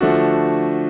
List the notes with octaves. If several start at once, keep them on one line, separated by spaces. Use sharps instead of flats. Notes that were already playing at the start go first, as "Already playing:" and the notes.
D3 F3 A3 D4 F#4